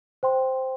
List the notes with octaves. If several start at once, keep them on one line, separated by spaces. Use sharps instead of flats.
C5 G5 C6